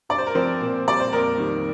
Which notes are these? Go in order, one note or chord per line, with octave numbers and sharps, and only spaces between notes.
G2 D5
C5
A#4
F3 C4 C5
A#2
G3 D5
C5
F2 A#3 A#4
D#3 G3